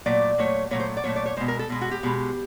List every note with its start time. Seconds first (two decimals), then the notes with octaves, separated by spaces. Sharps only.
0.06 A#2 F#3 A3 D5
0.38 A#2 F#3 A3 C#5
0.71 A#2 F#3 A3 C#5
0.80 C5
0.97 D5
1.04 A#2 F#3 A3 C#5
1.16 D5
1.26 C#5
1.37 B2 G#3 C5
1.48 A#4
1.59 A4
1.70 B2 G#3
1.81 F#4
1.91 G4
2.03 B2 G#3